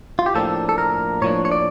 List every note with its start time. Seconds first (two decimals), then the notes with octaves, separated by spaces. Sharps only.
0.19 F4
0.26 G4
0.35 A2 F3 A#3 D4 A4
0.69 A4
0.78 A#4
1.22 A2 F3 A#3 D4 C#5
1.45 C#5
1.52 D5